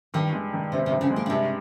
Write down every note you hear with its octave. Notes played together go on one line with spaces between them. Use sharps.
G2 D#3
G#3
D#3
C3 C4
C3
G2
C#3
G#3
A#3
C#3
G2 C3